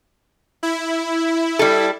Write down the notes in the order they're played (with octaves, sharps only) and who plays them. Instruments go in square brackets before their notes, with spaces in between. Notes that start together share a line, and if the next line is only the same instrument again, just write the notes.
[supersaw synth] E4
[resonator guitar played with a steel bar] G3 A4